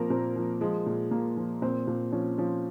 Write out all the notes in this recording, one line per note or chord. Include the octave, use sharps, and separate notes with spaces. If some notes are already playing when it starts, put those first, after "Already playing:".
Already playing: A#2 F3 A#3 C4 A#4
A#2 C4
F3
F3 G#3
A#2
A#2 A#3
F3
A#2 C4
A#2
F3 C#4
F3 C#4